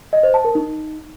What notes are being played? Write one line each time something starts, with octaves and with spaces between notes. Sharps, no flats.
D#5
C5
A5
A#4
D#4